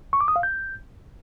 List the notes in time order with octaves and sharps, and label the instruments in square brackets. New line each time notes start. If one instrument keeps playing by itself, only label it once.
[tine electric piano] C#6
D6
D#6
F5
G6